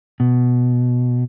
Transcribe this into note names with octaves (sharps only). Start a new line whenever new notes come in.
B2